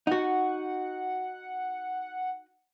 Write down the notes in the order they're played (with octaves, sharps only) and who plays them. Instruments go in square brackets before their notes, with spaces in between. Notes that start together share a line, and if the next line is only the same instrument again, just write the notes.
[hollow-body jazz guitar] D#4 F#4 [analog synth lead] F#5